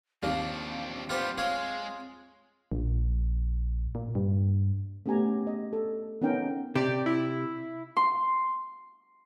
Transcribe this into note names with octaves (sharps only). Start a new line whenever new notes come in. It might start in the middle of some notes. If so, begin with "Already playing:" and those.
D#2 F3 A#3 C4 D4
G3 B3 F4 G4 C5
G#3 F4 G#4 C#5
A#1
A#2
G2
A3 B3 C#4 G4 G#5 A#5
D#5
A4
B3 C#4 D#4 A#4 G5
C3 G4 D5
E4
C6